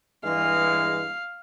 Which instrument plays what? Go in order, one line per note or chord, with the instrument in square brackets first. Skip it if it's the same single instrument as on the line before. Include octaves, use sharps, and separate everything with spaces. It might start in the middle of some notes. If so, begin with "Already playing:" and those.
[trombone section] G2 E3 G#3 [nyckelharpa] F5